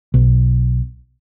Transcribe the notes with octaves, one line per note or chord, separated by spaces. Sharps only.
B1